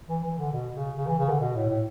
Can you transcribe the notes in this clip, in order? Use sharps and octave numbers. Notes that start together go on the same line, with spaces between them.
E3
E3
D3
B2
C#3
C#3
E3
C#3
D3
B2
A2
A2